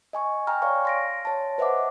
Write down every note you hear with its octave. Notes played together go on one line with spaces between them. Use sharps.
D#5 G#5 C#6
G5 G#5 A#5 F6
C#5 D5 F5 G#5 C#6
C6 A#6 D7
C#5 A5
B4 C5 D#5 E5 F#5 D6